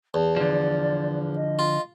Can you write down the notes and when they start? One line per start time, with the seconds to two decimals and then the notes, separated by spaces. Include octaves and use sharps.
0.14 E2 A5
0.36 D3 F3 D5
1.36 D#5
1.59 F4